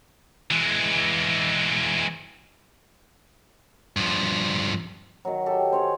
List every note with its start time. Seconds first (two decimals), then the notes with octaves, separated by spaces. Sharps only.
0.51 E3 G#3
3.97 G2 F3
5.25 D#3 F#3
5.46 G4 A4
5.72 C5 C#5 G#5